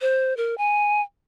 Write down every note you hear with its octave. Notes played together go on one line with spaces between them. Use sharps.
C5
A#4
G#5